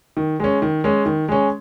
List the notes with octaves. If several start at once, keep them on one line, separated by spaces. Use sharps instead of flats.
D#3
G#3 C#4
D#3
G#3 C#4
D#3
G#3 C#4